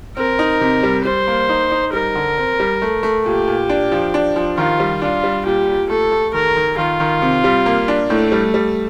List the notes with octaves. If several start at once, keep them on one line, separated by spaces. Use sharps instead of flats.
C4 A#4
D#4
C3
G3
G3 C5
A#3
D#4
D#4
G3 A#4
D3
C4
G3
A3
A3
A#2 G4
A#2
D4
F3
D4
F3
D#3 F4
G3
D4 F4
G3
A#2 G4
A#2
A3 A4
A3
D#3 A#4
D#3
D#3 F4
D#3
C3
G3
A#3
D4
A2 A3
G3
G3